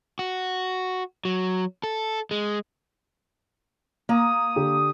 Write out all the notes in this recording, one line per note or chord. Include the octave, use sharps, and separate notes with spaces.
F#4
F#3
A4
G#3
A#3 A#5 D#6
D3 G4